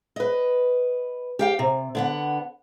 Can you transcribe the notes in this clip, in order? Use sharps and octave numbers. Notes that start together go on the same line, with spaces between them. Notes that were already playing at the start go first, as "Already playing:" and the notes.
B4 D#5
G4 F5 G5
C3
D3 B3 F#5